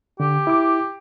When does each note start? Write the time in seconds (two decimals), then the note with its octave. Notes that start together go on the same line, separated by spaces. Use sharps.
0.20 D3 G4
0.47 E4 D6